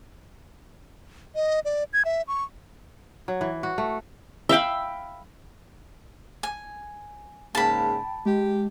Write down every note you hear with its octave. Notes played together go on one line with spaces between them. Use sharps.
D#5
D5
G#6
E5
C#6
F#3
E3
F#4
A3
E5 F5 G5 B5
G#5
G#2 C#3 A#3 G5 A5 B5
G#3 G4